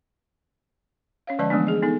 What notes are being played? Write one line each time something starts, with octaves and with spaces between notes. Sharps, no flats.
C#4 C#5 F5
D3 F3 G#3 D5 D#5 A5
E3 F3 G#3 A3 B3 D4
G#4 D#5
B3 D#4 A4